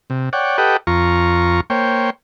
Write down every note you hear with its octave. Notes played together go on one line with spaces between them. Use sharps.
C3
C#5 D5 F#5 G5
G4 A4 B4 D#5 F#5 G5
F2 F4 A#5 C#6
A#3 C5 C#5 G5